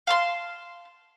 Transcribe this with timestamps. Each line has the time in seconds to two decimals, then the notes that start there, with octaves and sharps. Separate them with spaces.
0.07 F5 A5 C6